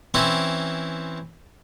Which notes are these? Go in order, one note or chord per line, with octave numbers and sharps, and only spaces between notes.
E3 C4 C#4 E4